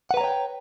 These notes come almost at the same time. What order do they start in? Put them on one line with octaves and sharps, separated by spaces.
F#5 B4 A#5 C#5 G5